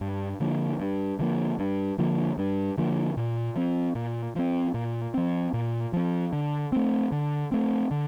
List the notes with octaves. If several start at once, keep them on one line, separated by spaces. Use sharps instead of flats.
G2
D3 F3 A#3
G2
D3 F3 A#3
G2
D3 F3 A#3
G2
D3 F3 A#3
A#2
F3 C4
A#2
F3 C4
A#2
F3 C4
A#2
F3 C4
D3
A3 C4
D3
A3 C4
D3